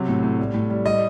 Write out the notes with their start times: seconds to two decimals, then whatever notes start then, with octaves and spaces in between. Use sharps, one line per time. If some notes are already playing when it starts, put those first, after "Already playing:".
Already playing: C3 F#3
0.08 A2
0.23 A2
0.39 G3
0.54 A2
0.70 G3
0.86 G3 D#5